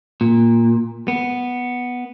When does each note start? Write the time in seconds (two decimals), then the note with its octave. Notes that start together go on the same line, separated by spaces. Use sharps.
0.21 A#2
1.08 B3